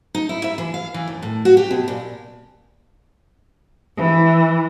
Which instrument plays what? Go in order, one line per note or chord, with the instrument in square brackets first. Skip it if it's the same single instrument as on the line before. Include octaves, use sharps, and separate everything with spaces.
[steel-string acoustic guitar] D#4
E4
E5
E3
F5
E3
D#2
A2
F#4
G4
B2
A#2
[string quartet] E3